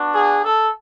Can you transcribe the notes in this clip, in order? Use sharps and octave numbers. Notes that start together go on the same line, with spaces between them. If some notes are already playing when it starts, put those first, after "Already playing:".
Already playing: B3 D4 F#4
G#4
A4